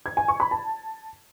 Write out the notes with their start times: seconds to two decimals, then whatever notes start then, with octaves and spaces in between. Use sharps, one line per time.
0.06 G#6
0.17 G#5
0.28 C#6
0.40 B5
0.51 A5